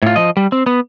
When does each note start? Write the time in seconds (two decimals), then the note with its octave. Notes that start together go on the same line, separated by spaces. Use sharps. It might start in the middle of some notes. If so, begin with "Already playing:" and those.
0.02 A2 F4
0.16 F3 D#5
0.37 G3
0.52 C4
0.66 B3